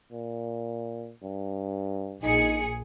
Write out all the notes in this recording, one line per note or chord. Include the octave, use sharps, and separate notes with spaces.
A#2
G2
A#1 D#4 G#4 C#7